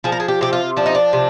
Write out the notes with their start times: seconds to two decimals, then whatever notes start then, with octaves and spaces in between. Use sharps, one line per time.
0.04 F3 G#4
0.12 A#4
0.20 G#4
0.28 G4
0.41 C3 G4
0.53 F4
0.77 F3 D4
0.86 D#4
0.95 D4
1.13 C3